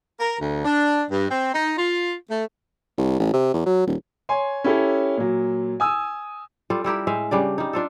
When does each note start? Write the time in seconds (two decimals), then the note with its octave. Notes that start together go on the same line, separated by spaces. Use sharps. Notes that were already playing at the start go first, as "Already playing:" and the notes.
0.20 A#4
0.39 D2
0.64 D4
1.11 G2
1.30 C4
1.54 D#4
1.78 F4
2.30 A3
2.98 C2
3.19 A1
3.33 C3
3.54 E2
3.66 F#3
3.87 D#1
4.29 C#5 G#5 C6
4.64 C#4 E4 G4 A4 C#5
5.17 A#2 F#3
5.80 G#5 D#6 E6
6.70 G3 F4 A4
6.84 G3 E4 G4 A#4
7.07 A2 G#3 E5 F5
7.31 C#3 G3 D4 D5
7.58 G3 D#4
7.73 D4 F4 A4